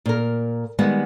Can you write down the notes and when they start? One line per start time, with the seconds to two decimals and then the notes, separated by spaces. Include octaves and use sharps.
0.06 A#2 A#4
0.78 D#3 G3 G#3 B3 F#5